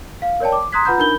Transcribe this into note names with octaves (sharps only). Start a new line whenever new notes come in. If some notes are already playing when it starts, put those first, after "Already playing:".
F5
A#4 C#5 D5 G5 A5
D6
A#5 C6 D#6 F#6 G#6 B6
F4 B4 F#5 A#5 B5 G6
D4 D#4 A#4 B5 G6 G7